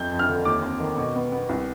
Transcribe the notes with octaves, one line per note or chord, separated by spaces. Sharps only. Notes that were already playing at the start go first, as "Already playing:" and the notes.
Already playing: F2 G6
F2
F6
D3
D#2 D6
C4
D#3
B2
B3
B3
C2